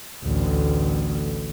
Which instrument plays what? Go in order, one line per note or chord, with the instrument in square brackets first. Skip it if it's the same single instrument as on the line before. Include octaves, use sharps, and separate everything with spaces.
[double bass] A1 D2